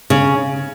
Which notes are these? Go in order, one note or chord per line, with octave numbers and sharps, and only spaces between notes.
C#3